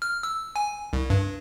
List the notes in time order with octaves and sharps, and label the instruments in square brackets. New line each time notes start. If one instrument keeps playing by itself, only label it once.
[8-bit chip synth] F6
E6
G#5
C2
G2